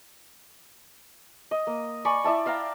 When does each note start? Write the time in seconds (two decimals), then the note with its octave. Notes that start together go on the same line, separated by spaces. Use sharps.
1.51 D#5
1.67 A#3
2.05 D5 G#5 B5 C#6
2.24 E4 D5 E5 A5
2.46 E5 F5 G5 A#5